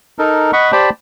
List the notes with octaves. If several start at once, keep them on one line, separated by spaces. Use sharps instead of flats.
D#4 A4 A#4
D#5 F#5 B5 C#6
G4 C5 D5 G5 A5 B5